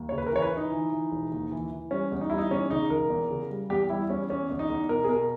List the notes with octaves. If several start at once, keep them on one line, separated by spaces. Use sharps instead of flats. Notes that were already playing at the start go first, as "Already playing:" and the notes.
Already playing: D#2
C#3 C#5
B4
A#4
E3 C#5
B4
E3 D#4
E3
E3
E1
D#2
E3
E3
G3 C#4
E2
D#4
G3 E4
D#4
E2 C#4
C#3 D#4
E1 A#4
E2
C#3
G3
E2 G4
G3 E4
E2 C#4
E2 C#4
E2
D#4
E2
B2 A#4
G#4
B2 A#4